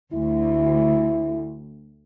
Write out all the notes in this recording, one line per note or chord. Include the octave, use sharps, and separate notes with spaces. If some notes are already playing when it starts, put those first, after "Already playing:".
D2 E4